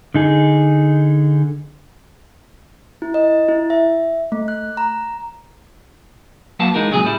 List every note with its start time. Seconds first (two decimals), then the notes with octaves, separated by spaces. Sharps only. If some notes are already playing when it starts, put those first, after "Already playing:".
0.14 D3 D#4 G#4
3.02 E4
3.14 D#5
3.48 E4
3.70 E5
4.32 A3
4.48 F#6
4.77 A#5
6.59 F#3 A#3 B3 F#4 F5 A5
6.74 E3 G#3 D#4 F4 A#4
6.91 A#2 C#3 F#3 G#3 G#4
7.04 A2 G3 E4